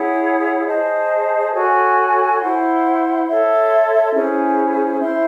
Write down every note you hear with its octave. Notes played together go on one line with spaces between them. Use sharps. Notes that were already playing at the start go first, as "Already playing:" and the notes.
Already playing: E4 G#4 C#5 F#5
G#4 C5 D#5 A5
F#4 A4 C#5 G#5
E4 C5 F#5 C6
A4 C#5 E5 C6
C#4 E4 G#4 C5
E4 C5 E5 C6